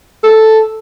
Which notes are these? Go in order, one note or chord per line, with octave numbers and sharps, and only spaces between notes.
A4